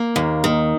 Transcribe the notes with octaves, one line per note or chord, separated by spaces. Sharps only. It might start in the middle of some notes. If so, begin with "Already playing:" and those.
Already playing: A#3
D#2
D#3